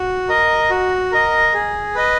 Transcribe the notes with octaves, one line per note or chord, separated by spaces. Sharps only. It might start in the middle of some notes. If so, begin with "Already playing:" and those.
Already playing: F#4
A#4 D#5
F#4
A#4 D#5
G#4
B4 D#5